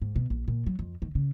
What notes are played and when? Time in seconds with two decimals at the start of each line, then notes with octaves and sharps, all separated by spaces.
0.02 G#2
0.16 B2
0.30 A#1
0.48 A#2
0.66 F#3
0.79 F2
1.02 D#3
1.15 C#3